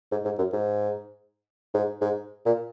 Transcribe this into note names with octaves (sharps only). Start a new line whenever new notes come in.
G#2
G#2
F#2
G#2
G#2
G#2
A#2